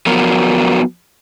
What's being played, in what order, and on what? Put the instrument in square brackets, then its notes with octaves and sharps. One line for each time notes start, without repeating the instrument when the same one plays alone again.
[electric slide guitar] F3 F#3 B3 F#4 A#4